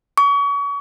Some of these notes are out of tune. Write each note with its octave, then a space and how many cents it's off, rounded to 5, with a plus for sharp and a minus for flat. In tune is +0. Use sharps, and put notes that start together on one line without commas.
C#6 +35